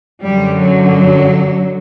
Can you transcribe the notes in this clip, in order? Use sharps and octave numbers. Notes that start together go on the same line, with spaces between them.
F#2 D3 G3
F#3